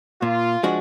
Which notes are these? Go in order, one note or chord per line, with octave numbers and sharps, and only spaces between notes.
A#2 F4
F3 G#3 D4 F#4